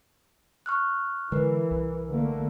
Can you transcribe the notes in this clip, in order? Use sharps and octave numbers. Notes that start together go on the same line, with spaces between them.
C#6 F6 F#6
D3 E3 G#3 A#4 B4
C2
D3 A3 A#3